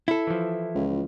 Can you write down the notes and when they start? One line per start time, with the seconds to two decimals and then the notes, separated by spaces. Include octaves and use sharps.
0.08 E4 A4
0.27 E3 F3
0.75 C#2